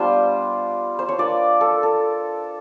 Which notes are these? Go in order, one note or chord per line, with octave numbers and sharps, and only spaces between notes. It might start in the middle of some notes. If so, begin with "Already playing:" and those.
Already playing: G3 B3 D4 F4 C5
C5
C#5
A#3 D4 F4 D5
A4
A4